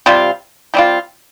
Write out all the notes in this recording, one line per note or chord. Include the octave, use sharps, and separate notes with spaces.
C3 G3 C4 F4
C3 G3 C4 F4